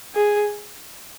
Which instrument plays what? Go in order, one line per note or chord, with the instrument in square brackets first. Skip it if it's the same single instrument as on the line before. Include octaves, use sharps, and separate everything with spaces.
[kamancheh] G#4